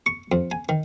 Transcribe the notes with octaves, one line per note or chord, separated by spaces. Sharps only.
C#6
F2
G#5
D#3